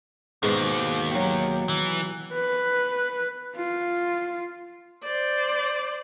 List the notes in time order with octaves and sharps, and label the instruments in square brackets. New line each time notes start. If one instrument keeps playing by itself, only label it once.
[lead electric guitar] D#2 [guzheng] G#2 B2
[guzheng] F#3 G4
[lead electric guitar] E3
[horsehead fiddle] B4
F4
[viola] C5 D5